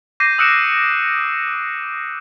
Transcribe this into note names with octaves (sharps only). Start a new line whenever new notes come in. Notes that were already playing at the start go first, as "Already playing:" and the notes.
D6 G6 A#6 C7 D#7
D#6 E6 F#6 C#7 D7 E7